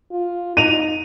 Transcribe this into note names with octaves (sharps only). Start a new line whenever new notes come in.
F4
D#4 D#7 F7